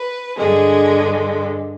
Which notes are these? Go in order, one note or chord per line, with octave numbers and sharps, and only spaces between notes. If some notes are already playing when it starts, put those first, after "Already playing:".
Already playing: B4
G2 D3 G#3 G#4